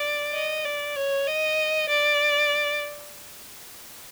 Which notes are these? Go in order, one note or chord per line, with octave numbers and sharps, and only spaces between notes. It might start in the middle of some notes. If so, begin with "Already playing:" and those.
Already playing: D5
D#5
D5
C#5
D#5
D5